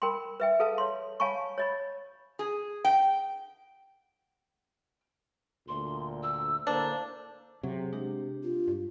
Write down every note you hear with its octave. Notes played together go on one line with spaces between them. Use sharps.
A#4 G5 B5 C6
B4 E5 G5
G#4 A4 B4 F5 A5
C#5 C6
C#5 F5 G#5 A5 B5 C#6
C#5 D#5 B5
G#4
G5
D2 A#2 C6
E6
A2 D3 A#3 D4 C5
C3 F#3 G#4 F#5
G#3 D4 G4
F4
G2